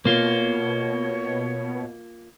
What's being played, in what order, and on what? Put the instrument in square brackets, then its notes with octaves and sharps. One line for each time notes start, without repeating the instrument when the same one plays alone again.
[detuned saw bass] B2 [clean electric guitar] A#3 F4 [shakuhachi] C#5